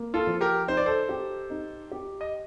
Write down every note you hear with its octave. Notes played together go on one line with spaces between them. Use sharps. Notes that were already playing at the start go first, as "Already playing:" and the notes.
Already playing: A#3
F4 A4
F3
G4 A#4
D#4 C5
D5
A4 C5
G4
D#4
G4
D#5